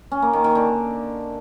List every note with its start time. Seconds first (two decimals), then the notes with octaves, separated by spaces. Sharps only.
0.11 C#4
0.22 A#3
0.33 D#3
0.44 D#3
0.55 D3